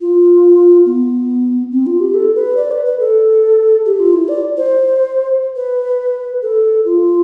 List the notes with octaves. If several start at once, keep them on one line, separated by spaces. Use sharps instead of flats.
F4
B3
C4
F4
G4
A4
B4
D5
B4
B4
A4
G4
F4
E4
D5
C5
B4
A4
F4